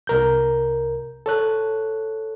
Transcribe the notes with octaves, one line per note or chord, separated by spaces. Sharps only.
C2 A#4 G6
A4 C#5 F#6